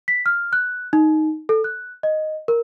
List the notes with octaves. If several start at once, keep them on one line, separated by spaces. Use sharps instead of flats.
B6
F6
F#6
D#4
A4
F#6
D#5
A#4